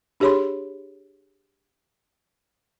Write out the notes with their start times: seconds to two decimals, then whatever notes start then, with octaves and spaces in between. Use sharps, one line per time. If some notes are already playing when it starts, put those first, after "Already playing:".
0.20 D4 G4 G#4 C#5 B5 C6